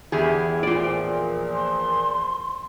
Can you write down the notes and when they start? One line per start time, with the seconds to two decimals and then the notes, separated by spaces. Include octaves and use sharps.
0.12 E2 E4 G4 G#4
0.63 A#2 F3 F4 D5
1.55 C6